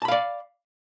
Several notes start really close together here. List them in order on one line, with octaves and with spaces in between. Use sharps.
A5 B5 F5 D5